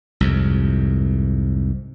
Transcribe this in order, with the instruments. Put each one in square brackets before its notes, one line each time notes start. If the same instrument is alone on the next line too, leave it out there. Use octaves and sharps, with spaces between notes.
[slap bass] C2 F2 G#2